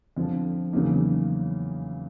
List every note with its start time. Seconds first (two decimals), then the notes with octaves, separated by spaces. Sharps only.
0.17 F2 D3 F3
0.73 E2 C#3 F#3 A#3 D#4